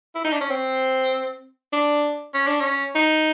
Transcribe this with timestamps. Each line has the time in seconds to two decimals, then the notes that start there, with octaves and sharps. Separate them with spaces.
0.15 E4
0.24 D#4
0.33 D4
0.41 C#4
0.51 C4
1.73 D4
2.34 C#4
2.47 D4
2.60 C#4
2.95 D#4